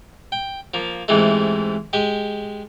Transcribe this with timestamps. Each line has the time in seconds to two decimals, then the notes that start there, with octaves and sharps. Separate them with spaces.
0.32 G5
0.74 F3 A#3
1.08 G#2 C3 E3 G#3 A3
1.93 G#3 G4 G#5